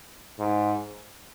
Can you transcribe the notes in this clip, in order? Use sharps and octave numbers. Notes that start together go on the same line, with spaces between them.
G#2